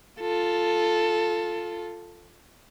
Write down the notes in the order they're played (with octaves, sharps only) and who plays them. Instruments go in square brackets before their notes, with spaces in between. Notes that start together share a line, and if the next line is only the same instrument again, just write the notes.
[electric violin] F4 A4